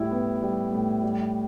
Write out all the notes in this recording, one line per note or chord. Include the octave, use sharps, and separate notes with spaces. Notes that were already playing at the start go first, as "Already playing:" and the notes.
Already playing: A2 G3 E4
B3
G3
A2
G3